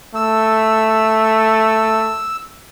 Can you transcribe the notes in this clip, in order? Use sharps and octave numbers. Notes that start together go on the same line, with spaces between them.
A3 E6